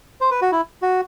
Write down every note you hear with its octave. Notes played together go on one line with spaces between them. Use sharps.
C5
B4
F#4
E4
F#4